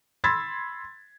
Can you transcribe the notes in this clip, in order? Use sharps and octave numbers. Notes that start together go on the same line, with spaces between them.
B5 C6 E6 G#6 A6 B6